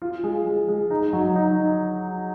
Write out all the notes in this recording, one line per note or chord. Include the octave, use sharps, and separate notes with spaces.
F4
G#3
G#3
G#3
D#4
F#3
D#4